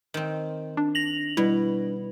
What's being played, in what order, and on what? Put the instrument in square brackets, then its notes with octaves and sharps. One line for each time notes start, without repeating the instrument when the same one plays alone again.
[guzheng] D#3 C4
[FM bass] D4
[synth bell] A#6 F7 F#7
[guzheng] B2 [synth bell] G3 E4